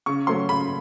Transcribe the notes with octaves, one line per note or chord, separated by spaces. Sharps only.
C#3 C#6
F#3 A3 C#4 C6
C#3 B5